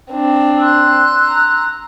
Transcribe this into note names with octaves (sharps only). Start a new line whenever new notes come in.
C4 D4
C6 E6 F#6
A#5